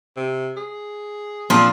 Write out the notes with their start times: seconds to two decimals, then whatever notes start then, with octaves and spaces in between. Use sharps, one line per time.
0.17 C3
0.57 G#4
1.50 A#2 F3 C4 D4